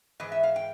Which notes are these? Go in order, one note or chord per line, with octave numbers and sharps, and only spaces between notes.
G#2 E3 D#5
E5
F5
G5